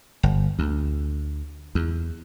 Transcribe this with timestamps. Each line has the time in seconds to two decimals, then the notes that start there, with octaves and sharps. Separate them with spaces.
0.23 G1
0.59 D2
1.75 E2